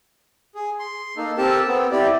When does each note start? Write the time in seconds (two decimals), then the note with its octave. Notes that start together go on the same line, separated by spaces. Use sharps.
0.55 G#4
0.79 C6
1.17 A#3 D#4 A4
1.37 C4 G4 A4 A#4 A5
1.67 B3 C4
1.91 E4 G4 D5